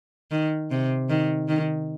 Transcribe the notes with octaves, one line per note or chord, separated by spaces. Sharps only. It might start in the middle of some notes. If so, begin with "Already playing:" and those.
D#3
C3
D#3
D#3